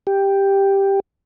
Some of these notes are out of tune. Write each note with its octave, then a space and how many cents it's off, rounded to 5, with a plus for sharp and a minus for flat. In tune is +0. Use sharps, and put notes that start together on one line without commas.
G4 +5